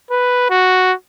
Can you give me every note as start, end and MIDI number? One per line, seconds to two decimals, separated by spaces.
0.11 0.47 71
0.50 0.93 66